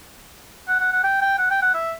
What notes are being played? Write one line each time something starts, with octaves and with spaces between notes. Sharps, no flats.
F#5
F#5
F#5
G5
G5
F#5
G5
F#5
E5